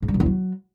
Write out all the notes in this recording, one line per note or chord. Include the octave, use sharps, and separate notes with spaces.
G#2
G3
B2
E2
F#3